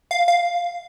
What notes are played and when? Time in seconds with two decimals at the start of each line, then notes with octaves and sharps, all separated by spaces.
0.11 F5
0.28 F5